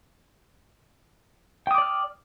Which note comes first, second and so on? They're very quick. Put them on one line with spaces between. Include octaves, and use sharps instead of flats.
G5 D#6 D6 D5 F6